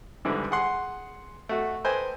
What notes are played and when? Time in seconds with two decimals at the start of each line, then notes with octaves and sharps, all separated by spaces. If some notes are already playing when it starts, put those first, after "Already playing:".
0.25 G#2 D3 E3 G3
0.51 G#4 F#5 C6
1.49 A3 F#4
1.84 A4 B4 C5 D#5 G5 G#5